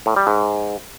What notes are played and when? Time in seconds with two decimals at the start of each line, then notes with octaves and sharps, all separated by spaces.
0.06 A2
0.16 G3
0.27 G#2